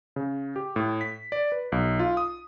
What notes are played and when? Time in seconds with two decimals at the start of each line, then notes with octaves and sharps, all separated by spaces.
0.16 C#3
0.56 G4
0.76 A2
1.01 B6
1.32 D5
1.52 B4
1.72 B1
1.99 F4
2.17 D#6